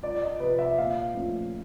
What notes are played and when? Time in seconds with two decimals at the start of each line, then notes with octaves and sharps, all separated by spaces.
0.03 C#2 D5
0.22 D#5
0.40 C3 F3 B4
0.59 E5
0.78 A#2 F5
1.15 F3 A3 C#4